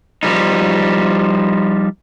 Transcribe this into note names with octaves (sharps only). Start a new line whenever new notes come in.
F3 G3 D#4